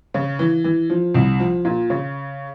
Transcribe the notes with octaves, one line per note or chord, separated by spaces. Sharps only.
C#3
E3
E3
F3
C2
F3
A#2
C#3